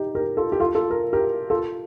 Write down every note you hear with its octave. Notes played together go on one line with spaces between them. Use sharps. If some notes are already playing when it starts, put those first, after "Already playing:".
Already playing: D#4 G4
G4 A#4
F4 A4
G4
F4 A4
F4 A4
A#4
G4 A#4
F4 A4